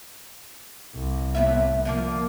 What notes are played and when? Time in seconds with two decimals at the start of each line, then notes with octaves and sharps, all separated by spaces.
0.95 C2
1.35 A2 B3 E5
1.85 D3 F3 A#3